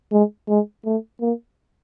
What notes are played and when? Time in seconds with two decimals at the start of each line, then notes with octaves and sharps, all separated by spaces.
0.12 G#3
0.48 G#3
0.85 A3
1.21 A#3